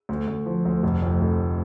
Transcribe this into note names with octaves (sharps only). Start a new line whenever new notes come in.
D2
D2
F3
D2
F1
F2
F1